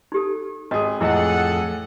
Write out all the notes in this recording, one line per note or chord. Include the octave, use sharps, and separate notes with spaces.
D#4 G4 A4
G#1 G#4 D#5
F2 A2 E3 E4 G#4 A4 D#5 F#5